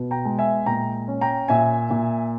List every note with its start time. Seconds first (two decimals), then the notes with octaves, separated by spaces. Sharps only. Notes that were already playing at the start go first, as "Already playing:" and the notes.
Already playing: B2 B3
0.11 G5 A#5
0.25 G#3
0.39 E5 G#5
0.66 A#2 G5 A#5
1.08 C#4
1.21 G5 A#5
1.48 A#2 E5 G#5
1.90 A#2